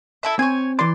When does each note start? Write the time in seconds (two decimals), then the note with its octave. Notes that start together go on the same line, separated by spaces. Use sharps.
0.23 E4 A4 E5
0.39 C4 C#5 G#5
0.79 E3 D5 C6